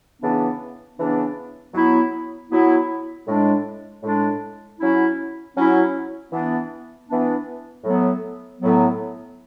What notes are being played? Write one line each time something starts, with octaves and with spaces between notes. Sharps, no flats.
C#3 E3 B3 D4
C#3 E3 B3 D4
F#3 B3 E4
F#3 B3 E4
A2 G#3 D4
A2 G#3 D4
F#3 C#4 E4
F#3 C#4 E4
E3 B3 D4
E3 B3 D4
A2 F#3 B3
A2 F#3 B3